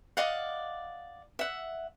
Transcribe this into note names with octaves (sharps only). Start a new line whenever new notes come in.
D5 D#5 F5 F#5
E5 F#5